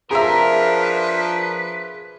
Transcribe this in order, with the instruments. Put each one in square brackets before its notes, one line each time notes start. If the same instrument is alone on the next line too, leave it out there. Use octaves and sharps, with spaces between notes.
[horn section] F3 D4 [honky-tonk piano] G#4 E5 [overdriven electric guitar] A#4 [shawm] B4